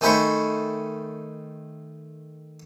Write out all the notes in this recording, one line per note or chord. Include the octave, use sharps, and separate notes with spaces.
D#3 A3 G#4 C5 B5 C#6